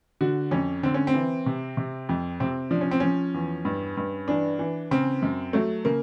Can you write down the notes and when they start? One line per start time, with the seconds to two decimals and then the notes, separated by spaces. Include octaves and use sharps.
0.21 D3 F#4
0.51 F2 C#4
0.83 D3 C4
0.94 C#4
1.07 C4
1.14 E3
1.46 C3
1.77 C3
2.09 F2
2.40 C3 C4
2.71 F3 D4
2.81 C#4
2.91 C4
3.00 F3 C#4
3.34 E2
3.65 G2
3.97 G2
4.28 E3 D4
4.59 E3
4.91 C#3 C4
5.22 F#2
5.53 F#3 A3
5.85 C#3 A#3